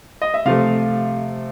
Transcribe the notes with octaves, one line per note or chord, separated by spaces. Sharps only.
D#5
E5
C3 F3 A3 F5